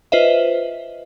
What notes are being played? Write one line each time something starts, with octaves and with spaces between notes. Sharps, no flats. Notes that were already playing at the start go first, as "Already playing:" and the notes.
F4 B4 C5 D#5 E5